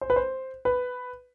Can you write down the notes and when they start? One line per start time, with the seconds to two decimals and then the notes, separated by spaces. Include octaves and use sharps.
0.01 C5
0.10 B4
0.16 C5
0.65 B4